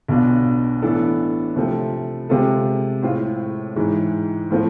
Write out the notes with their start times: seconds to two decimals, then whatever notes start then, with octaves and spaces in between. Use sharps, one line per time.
0.08 B1 B2 B3 D4 F4
0.82 A2 E3 B3 D4 A4
1.56 C3 F3 A3
2.29 C3 G#3 C4 F4 A4
3.03 A2 G#3 C4 F4
3.76 G#2 E3 G#3
4.51 A2 F3 A3 C4